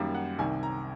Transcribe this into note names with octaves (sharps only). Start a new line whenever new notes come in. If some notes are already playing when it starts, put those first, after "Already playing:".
Already playing: F#2 D#3 G3 A#3
F#5
C2 C3 D#3 G#5
A#5